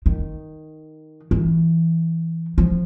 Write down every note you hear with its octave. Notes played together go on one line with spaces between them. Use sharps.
D#3
E3
F3